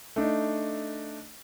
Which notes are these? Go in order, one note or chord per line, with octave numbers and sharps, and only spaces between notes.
A3 D4 D#4